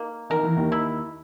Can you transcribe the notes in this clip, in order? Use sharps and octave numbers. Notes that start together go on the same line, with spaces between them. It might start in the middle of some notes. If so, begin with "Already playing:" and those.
Already playing: A#3 D#4
D#3 A#4
E3
D#2 D#3
E4